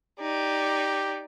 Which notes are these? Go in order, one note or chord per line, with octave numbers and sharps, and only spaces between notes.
D#4 G4 D5